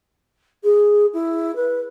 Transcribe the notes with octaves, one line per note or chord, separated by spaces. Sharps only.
G#4
E4
B4